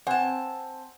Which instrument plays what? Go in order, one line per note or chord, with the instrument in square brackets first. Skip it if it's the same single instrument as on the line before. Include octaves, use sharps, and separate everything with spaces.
[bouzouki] C4 A5 [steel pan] F#5 G#5